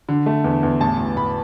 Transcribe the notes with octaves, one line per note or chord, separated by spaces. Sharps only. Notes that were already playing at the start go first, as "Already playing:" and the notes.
D3
A3
E2
E2
A1 A5
A1
A1 B5